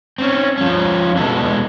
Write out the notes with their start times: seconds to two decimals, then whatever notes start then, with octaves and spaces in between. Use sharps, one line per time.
0.18 C4 C#4
0.58 F3 C#4
1.16 B2 E3 G#3 A4